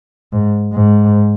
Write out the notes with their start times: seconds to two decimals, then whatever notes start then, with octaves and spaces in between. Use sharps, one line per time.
0.33 G#2
0.74 G#2